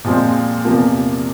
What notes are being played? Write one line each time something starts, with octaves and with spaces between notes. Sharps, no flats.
A#2 F3 G#3 C4
E2 C3 F3 A#3